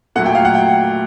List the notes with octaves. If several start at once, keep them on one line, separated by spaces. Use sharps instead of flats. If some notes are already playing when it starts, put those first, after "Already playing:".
A#2 F#3 A3 F#5
G5
F5
F#5
G5